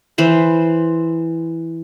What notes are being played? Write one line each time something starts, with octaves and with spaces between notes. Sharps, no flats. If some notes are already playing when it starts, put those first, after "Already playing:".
E3 C5 B5